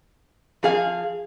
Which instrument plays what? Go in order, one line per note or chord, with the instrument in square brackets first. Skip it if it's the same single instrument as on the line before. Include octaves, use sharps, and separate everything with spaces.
[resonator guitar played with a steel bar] F3 G#4 F5